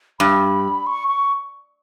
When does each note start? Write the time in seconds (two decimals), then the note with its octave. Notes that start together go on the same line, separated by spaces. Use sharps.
0.19 G2 B5
0.87 C#6
1.08 C#6